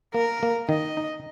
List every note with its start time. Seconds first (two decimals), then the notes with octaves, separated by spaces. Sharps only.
0.14 A#3 A#4
0.43 A#3
0.69 D#3 D#5
0.97 D#4